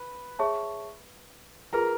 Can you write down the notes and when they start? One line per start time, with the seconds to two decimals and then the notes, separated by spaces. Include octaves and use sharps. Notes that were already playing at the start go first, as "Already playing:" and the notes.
Already playing: B4
0.39 G#4 C#5 E5 A5 C#6
1.73 F4 G#4 A#4 B4 A#5